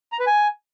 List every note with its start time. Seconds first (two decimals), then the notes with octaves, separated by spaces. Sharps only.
0.12 A#5
0.19 B4
0.27 G#5